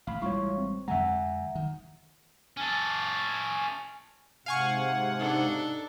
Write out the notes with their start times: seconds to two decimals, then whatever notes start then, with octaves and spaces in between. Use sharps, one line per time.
0.07 A1 F5 B5
0.22 A1 G3 G#3 E4 F4 C#5 C#6
0.58 C4
0.88 F2 D3 G#3 E5 F#5 G#5 A#5
1.55 D#3
2.57 C#4 A4
4.46 G#2 C3 F5 F#5 G#5 C#6
5.19 D4 D#4 A4